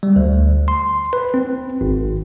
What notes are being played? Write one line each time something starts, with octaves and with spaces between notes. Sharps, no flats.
G3
D2
C6
B4
C4
G#1